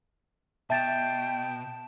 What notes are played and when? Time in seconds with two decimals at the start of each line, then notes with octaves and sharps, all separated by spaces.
0.70 B2 E5 G5 A5 A6 E7